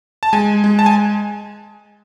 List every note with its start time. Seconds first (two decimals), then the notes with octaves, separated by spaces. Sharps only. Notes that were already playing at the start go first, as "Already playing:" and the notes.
0.23 A5
0.33 G#3 G#5
0.64 G#3
0.79 A5
0.86 G#5